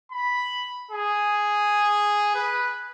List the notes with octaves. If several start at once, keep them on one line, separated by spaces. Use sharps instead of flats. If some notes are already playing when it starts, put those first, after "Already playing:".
B5
G#4
B4